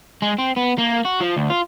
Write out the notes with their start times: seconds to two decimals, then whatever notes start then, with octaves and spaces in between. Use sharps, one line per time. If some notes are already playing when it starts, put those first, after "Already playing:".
0.22 G#3
0.39 C4
0.57 B3
0.78 A#3
1.05 F#4
1.20 F3
1.36 D2
1.50 F4